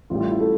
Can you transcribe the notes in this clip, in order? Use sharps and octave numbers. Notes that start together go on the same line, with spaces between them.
A1 A2 G3 F4
F4
E4
A3